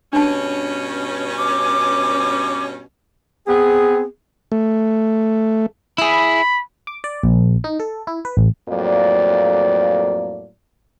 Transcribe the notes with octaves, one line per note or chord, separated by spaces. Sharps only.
G2 B2 C#4 D4 A5
D6
B3 C4 G#4
A3
E4 G#4 B5
D6
D5
A#1
D#4
A4
E4
B4
A1
F2 A2 F#3 A#3 D5